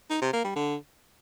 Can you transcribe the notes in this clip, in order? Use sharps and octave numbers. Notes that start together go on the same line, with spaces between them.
D#4
C3
A#3
G3
D3